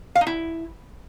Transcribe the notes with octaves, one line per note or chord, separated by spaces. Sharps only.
F5
D#4
E4